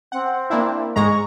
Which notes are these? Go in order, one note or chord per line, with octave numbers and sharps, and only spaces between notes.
C4 F#5
A#3 D4 E4
G#2 G#3 A#5 C#6